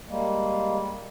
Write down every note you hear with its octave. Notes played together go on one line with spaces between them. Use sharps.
G3 G#3 A#3